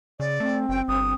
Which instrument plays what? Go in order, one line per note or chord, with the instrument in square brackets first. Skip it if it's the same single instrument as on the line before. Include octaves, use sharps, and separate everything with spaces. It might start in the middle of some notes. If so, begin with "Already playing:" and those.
[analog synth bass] C#3 [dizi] D5
[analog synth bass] A3 [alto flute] C4
[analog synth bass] F#1 [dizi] G5
[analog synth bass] G1 [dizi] D#6